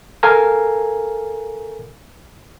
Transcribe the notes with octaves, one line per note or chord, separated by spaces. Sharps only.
A4 A#4 F5 G#5 A#5